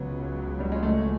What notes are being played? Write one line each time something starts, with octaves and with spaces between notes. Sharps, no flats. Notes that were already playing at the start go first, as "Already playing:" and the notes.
Already playing: C#2 C#3 F#3 B3
G3
G#3
A3